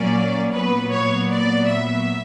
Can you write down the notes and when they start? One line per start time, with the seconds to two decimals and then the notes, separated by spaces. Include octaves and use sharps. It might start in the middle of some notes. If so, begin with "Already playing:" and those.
Already playing: A#2 F#3 A#3 C#4 D5
0.54 A#2 F#3 B3 B4
0.91 C#5
1.30 D5
1.67 E5